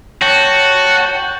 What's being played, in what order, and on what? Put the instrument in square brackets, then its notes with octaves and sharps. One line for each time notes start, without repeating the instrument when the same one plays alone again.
[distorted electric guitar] F#4 [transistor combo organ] C#5 G5 A5